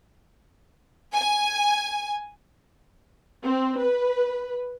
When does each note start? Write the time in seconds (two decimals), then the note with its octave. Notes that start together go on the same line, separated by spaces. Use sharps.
1.14 G#5
3.45 C4
3.80 B4